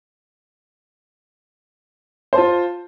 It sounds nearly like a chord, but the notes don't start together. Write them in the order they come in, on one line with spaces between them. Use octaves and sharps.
C5 A5 F4